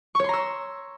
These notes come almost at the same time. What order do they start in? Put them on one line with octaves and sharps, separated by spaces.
C#6 C#5 C6 A#5 E6